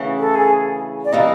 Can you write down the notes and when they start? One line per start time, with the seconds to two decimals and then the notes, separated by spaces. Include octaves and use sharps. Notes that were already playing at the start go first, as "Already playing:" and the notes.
Already playing: D2 C#3 E3
0.19 A4
0.35 G#4
1.05 D5
1.12 C3 E3 G3 A#3 D#5